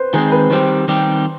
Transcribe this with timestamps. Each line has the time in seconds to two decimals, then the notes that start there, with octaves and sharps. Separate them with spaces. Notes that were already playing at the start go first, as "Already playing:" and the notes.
Already playing: B4 C5
0.13 D#3 G#3 C4 G#4
0.32 B4
0.50 D#3 G3 C4 G4 C5
0.88 D#3 G3 C4 G4